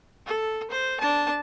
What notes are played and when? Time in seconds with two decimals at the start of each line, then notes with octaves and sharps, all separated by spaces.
0.26 A4
0.70 C5
1.00 D4 A5